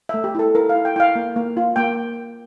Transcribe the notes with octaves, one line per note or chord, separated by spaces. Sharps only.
A3 E5
G4
E4 A4
E4 A#4
F5
E4
G5
E4 F5 G5
A#3
A#3
F4
A#3 G5